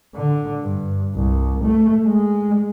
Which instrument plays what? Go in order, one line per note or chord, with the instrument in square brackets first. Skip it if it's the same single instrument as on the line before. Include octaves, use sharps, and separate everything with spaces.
[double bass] D3
G2
C2
A3
G#3